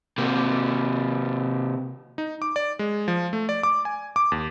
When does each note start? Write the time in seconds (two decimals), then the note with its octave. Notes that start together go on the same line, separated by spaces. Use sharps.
0.18 C3 A#3
2.18 D#4
2.42 D6
2.56 D5
2.79 G#3
3.08 F3
3.33 A3
3.49 D5
3.63 D6
3.85 G#5
4.16 D6
4.32 D#2